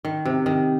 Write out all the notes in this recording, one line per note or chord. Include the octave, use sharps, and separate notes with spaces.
D#3
C3
D#3